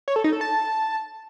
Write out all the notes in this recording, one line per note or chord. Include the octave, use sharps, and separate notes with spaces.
C#5
A4
D#4
A4
A5